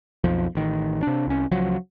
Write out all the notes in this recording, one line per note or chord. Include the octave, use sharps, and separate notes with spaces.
B1 F2 F3
A1 D#3
C3 D4
C2 C#4
C#2 F3 F#3